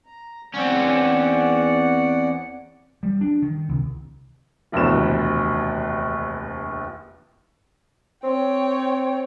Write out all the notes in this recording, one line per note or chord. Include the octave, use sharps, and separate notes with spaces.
A#5
E2 C4 C#4 D5 F#5
G3
D4
D#3
C2
F1 A#1 D#2 B2 E3 E7
C4 C#5 G5